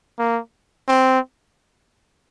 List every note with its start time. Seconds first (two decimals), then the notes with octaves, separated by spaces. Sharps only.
0.19 A#3
0.88 C4